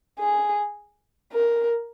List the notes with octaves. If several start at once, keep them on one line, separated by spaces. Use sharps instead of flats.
G#4
A#4